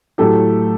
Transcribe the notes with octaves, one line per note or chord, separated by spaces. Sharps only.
A2 F#3 A3 G4 A4